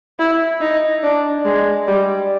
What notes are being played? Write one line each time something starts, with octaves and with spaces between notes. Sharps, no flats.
E4
D#4
D4
G#3
G3